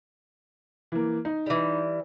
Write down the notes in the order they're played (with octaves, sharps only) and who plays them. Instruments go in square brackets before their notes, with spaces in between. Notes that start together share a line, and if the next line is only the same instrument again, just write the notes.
[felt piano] E3 A#3
D#4
[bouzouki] E3 G3